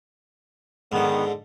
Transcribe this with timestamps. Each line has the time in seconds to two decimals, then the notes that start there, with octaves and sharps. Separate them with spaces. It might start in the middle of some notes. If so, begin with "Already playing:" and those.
0.92 G#2 D3 D#3 B3